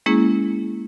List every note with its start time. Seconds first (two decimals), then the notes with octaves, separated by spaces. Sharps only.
0.06 G#3 A#3 C#4 E4 G#4